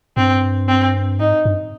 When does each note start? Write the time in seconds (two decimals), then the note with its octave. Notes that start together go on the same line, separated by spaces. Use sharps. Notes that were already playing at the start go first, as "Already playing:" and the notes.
0.17 G2 C4
0.68 C4
1.19 G#2 D#4
1.45 G2